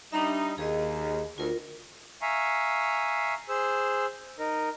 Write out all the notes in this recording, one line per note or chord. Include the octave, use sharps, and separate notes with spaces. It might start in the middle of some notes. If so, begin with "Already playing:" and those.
G3 D4 D#4 E5
D#2 G#4 D#5
D2 F4 A#4
E5 F5 G#5 A#5 C#6
G#4 C5 E6
D#4 A#4